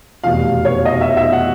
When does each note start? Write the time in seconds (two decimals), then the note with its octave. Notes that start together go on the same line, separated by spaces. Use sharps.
0.24 F1 E2 B2 F5
0.65 C#5
0.85 D#5
1.01 E5
1.17 E5
1.32 F#5